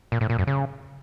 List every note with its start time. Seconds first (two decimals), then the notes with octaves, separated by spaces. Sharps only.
0.12 A#2
0.21 A2
0.30 A#2
0.39 F#2
0.47 C#3